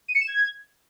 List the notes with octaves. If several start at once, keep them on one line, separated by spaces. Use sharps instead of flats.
D#7
C#7
E7
G#6